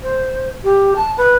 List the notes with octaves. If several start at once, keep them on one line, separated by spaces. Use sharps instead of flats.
C5
G4
A5
B4